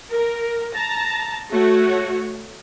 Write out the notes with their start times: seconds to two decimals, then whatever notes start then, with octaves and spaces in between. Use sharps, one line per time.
0.12 A#4
0.74 A5 A#5
1.51 A3 F#4 C#5